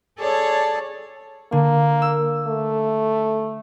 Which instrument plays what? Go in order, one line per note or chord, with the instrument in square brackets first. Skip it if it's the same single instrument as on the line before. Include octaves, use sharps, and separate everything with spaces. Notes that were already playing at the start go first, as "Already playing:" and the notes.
[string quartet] G#4 A4 C#5 D5 A5
[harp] D3 [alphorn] A#3
[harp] E6
[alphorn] A3